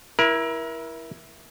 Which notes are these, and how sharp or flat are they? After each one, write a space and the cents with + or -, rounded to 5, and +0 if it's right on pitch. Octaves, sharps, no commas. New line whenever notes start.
E4 +0 A#4 +30